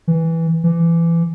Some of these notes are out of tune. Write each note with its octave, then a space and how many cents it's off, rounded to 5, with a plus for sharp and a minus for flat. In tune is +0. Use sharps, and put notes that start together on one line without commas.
E3 -5
E3 +25